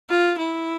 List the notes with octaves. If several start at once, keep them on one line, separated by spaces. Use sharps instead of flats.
F4
E4